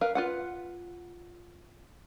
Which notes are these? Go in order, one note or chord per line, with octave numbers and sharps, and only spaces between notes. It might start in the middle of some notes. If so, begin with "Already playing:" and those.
A#4 B4 F5
F4 B4 F#5